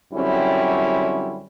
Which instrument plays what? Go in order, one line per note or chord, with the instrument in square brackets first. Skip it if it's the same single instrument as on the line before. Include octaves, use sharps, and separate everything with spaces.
[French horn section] F#2 D3 G3 C4 C#4 E4